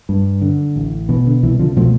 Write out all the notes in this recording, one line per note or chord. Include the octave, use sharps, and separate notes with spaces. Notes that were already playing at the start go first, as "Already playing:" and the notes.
G2
D3
A1
B2 E3
D3
C2 E3
D3 F3
B2 F3 A3